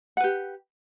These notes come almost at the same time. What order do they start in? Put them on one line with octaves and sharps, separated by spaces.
F#5 B4 G4